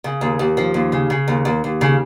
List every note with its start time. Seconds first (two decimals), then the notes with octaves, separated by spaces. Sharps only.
0.04 C#3
0.21 D#2
0.39 D#2
0.57 F3
0.74 D#2
0.92 C#3
1.10 C#3
1.28 D#2
1.45 D#2
1.64 D#2
1.81 C#3